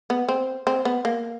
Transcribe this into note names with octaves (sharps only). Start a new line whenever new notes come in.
B3
C4
C4
B3
A#3